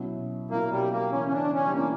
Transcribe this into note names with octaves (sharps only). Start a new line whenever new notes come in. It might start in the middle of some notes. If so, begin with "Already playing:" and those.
Already playing: B2 F#3 C#4 E4
B2 F#3 A#3 C#4 E4
G3
A#3
C#3 E3 B3 C#4 E4
C#4
D4
C#4
G3
C#3 E3 A#3 B3 E4